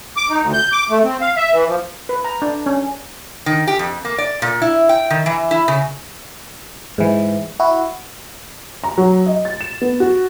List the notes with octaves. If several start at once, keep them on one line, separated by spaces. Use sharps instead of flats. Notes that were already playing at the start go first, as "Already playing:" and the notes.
D6
D#4
D2
G6
D6
A3
C4
F5
E5
E3
F3
B4
A#5
D4
C#4
D#3
G4
F2
A#3
D5
A#2
E4
G5
D#3
E3
E4
C#3
G#2 E3
E4 F#4
A#5
F#3
D#5
A6
E7
B3
F#4